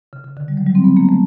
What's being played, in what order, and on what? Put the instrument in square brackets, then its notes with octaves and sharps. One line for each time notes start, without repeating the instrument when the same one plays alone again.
[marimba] C#3
C#3
D3
G3
F#3
G3
C4
B3
A#3
A3